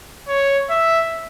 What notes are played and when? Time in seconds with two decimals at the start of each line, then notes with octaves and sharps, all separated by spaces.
0.29 C#5
0.70 E5